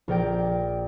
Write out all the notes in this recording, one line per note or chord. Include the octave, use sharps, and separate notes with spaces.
A#1 A#4 D5 G5 D7